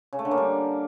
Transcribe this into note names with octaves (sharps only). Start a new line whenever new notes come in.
C#3
A3
D3
A#3
G3